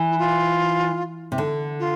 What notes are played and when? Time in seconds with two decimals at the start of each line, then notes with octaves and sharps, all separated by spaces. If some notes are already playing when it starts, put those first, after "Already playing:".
Already playing: E3
0.11 E4
0.18 F4
1.32 C3
1.38 D3
1.79 F4